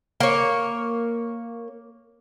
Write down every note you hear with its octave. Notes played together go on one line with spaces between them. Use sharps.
A#3 C#5